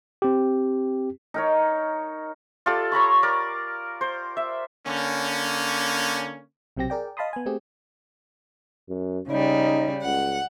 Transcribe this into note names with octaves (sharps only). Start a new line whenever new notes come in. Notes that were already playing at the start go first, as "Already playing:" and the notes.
C4 G4
D#4 A#4 C#5
F4 G4 A4 D5
C#5 A#5 B5 C#6
A#4 D5
C5
E5
D3 A#3 C#4
B1 C3 F#3 C4 G4 A#6
G#4 A#4 D5 G5
D#5 F5 A5 B5 C6 D#6
B3 G#5
A3 C4 G4 G#4
F#2
C#3 G3 D#4
C#2 F#5